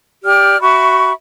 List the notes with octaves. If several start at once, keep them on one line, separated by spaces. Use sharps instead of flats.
G4 D5 F6
F#4 E5 B5 C#6